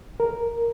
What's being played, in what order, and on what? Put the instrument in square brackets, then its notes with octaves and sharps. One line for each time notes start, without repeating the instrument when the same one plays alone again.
[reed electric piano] A#4